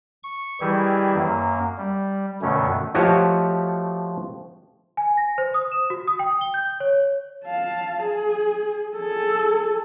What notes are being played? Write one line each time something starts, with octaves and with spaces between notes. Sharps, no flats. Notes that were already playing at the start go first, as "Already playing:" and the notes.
C#6
D#3 E3 G3 E4 G4 G#4
F#2 A#3
G3
F#2 B2 D3 D#3 A3 C#4
F3 A3 F#4 G4 C#5 D#5
G#5
A#6
C5
D#6
E7
F#4
D#6
G5
G7
G6
C#5
F5 A5
G#4
G#4 A4